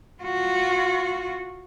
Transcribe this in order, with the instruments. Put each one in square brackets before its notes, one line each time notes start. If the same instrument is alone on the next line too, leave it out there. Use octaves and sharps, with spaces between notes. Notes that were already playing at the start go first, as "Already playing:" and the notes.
[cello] F4 F#4